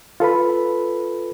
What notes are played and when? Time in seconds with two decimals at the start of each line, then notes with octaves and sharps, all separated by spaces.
0.20 F4 A4 B4 B5